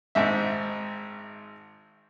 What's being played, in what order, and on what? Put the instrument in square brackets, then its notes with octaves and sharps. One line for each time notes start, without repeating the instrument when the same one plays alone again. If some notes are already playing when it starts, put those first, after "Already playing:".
[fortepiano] G#1 G#2 E5